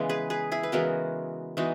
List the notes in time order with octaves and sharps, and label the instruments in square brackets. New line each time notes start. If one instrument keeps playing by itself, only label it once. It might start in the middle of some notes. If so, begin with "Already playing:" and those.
Already playing: [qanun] C#3 E3 G#3 B3
G#4 B4
G#4 B4
E4 G#4
B4
C#3 E3 G#3 B3 F#4 A#4
E3 G#3 B3 D#4 F#4